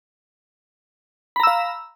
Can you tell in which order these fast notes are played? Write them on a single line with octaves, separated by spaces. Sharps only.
B5 A#5 E6 F5